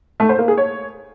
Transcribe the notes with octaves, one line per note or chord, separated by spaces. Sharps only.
A3
C5
A#3
G#4
C#5